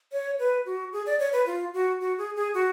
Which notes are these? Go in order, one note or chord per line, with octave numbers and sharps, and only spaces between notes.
C#5
B4
F#4
G#4
D5
C#5
B4
F4
F#4
F#4
G#4
G#4
F#4